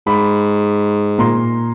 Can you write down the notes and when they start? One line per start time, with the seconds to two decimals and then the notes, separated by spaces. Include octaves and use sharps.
0.07 G#2 B5
1.18 A#2 A#5 C6